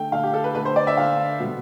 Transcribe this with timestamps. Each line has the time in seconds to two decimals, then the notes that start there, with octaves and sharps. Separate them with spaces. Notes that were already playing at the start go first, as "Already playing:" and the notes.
Already playing: D3 A3 G5
0.12 D3 A3 F5
0.23 G4
0.33 A4
0.44 B4
0.55 D3 A3 B4
0.65 C5
0.76 D5
0.87 E5
0.97 D3 A3 F5
1.40 B2 G3 B3